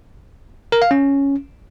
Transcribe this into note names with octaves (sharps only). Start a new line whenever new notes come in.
A#4
F5
C#4